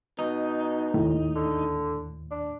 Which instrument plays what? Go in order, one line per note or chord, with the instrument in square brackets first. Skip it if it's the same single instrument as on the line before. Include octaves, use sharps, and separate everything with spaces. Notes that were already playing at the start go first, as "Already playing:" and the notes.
[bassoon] B2 [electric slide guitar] D#4
[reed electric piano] D#2 A2
[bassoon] D3
D4